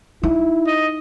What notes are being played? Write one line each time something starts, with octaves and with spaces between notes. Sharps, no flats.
D#4 E4
D#5